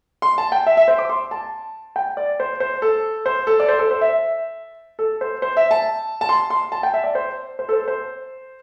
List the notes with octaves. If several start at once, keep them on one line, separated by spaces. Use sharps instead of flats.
C6
A5
G5
E5
E5
C5
D6
C6
A5
G5
D5
C5
C5
A4
C5
A4
D5
C5
A4
C5
E5
A4
C5
C5
E5
A5
A5
C6
C6
A5
G5
E5
D5
C5
C5
A4
C5
C5